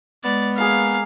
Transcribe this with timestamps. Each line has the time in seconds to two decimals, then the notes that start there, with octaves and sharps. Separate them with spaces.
0.24 G#3 B3 D5
0.58 A#3 G#4 F5